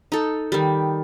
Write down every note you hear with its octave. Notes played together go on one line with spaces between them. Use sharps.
D#4 A4
D#3 G3